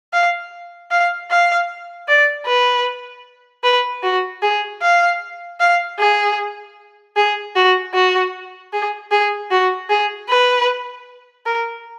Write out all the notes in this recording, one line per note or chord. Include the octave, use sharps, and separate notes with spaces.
F5
F5
F5
D5
B4
B4
F#4
G#4
F5
F5
G#4
G#4
F#4
F#4
G#4
G#4
F#4
G#4
B4
A#4